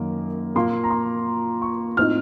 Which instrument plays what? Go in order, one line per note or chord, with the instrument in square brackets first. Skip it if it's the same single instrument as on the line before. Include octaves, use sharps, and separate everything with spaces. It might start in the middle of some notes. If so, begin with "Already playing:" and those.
Already playing: [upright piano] F#2 D#3 A#3
A#2 F3 A#3 C6
A#5
C6
C#6
A2 F3 C4 D#4 F6